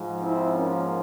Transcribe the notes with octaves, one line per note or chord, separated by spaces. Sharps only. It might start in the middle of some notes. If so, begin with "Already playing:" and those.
Already playing: G#2 F3
C4 E4
A#3 C#4